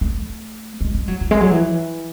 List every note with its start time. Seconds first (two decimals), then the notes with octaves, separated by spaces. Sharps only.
0.01 A3
0.81 G#3
0.94 G#3
1.08 F#3
1.21 E3
1.31 G#3
1.41 F#3
1.51 E3